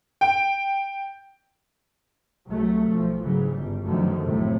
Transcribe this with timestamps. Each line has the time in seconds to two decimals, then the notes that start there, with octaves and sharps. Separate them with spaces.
0.21 G5
2.47 C2 F#3 A3
2.89 B1 F3
3.23 G#2 C#3 E3 F#3
3.52 G1 G3
3.86 F#2 B2 D3 D#3 F3 A3
4.23 A1 F2 A2 C3 A3